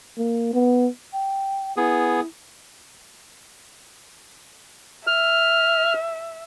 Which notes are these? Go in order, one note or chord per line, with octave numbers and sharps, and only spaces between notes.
A#3
B3
G5
B3 E4 G#4
E5 F6